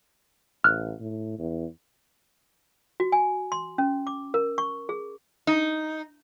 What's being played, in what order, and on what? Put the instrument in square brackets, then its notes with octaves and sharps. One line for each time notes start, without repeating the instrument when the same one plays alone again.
[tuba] A1 [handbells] F6 F#6
[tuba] A2
E2
[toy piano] F#4
G#5
C6
C#4
D6
A#4
C#6
G#4
[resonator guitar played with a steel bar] D#4